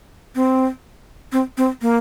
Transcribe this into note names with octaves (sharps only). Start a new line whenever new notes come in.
C4
C4
C4
A#3